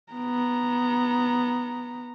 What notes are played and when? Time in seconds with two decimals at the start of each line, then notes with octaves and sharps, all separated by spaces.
0.13 B3 A#5